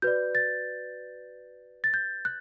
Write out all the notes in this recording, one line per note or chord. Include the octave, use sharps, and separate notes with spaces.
F#4 B4 D5 G6
A6
A6
G6
F#6